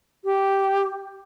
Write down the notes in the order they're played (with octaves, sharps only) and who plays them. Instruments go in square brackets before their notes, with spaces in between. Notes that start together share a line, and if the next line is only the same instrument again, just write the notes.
[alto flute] G4